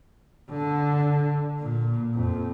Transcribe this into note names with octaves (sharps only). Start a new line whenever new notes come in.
D3
A#2
F2